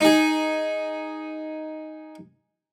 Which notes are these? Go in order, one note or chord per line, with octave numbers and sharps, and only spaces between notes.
D#4 G#4